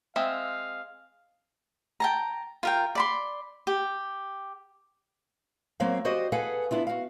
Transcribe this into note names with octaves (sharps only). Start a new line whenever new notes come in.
G#3 C4 E5 F5
G5 A5 A#5
F4 A#4 G5
D5 B5 C6
G4
F#3 A#3 C4 C5 C#5 F5
F#4 G4 C5 D5 D#5
G#4 A4 B4 F5 F#5 G#5
B3 D4 E4 F4
F#4 F5